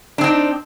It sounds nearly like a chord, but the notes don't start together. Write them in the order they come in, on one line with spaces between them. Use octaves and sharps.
D4 C4 D#4